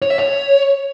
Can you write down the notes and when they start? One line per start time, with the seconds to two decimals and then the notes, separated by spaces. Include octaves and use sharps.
0.02 C#5
0.10 E5
0.18 C#5